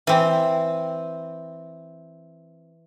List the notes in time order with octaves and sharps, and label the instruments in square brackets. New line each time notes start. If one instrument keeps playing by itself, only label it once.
[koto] E3 C4